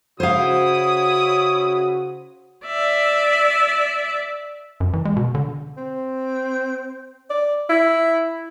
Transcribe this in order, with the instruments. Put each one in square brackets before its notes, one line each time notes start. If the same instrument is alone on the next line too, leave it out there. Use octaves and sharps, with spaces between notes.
[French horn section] C#3 F#4 [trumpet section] E4 C#5 D#6 [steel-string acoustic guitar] C5 F5
[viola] D5 E5
[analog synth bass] F#2
E3
G#3
B2
D3
[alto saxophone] C4
D5
E4